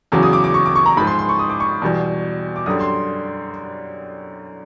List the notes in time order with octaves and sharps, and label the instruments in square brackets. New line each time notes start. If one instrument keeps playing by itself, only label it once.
[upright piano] E2 C#3 F#3 D6
D#6
D6
D6
C#6
D6
C#6
A#5
G#2 B5
F3
C6
C6
C#6
D#6
D6
C#6
E2 B2 G3
D6
F#2 D3 G3 D#6
C6